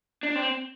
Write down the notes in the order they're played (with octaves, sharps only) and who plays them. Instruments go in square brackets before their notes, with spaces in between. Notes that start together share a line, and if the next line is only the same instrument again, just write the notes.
[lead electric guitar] D4
C4